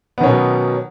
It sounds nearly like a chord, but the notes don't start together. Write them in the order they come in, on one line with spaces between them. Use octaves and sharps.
B3 D#3 C#4 B2 F#3